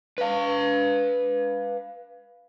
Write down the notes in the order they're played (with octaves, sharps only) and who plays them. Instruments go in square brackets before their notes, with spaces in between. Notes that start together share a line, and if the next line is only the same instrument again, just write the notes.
[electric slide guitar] B4 F5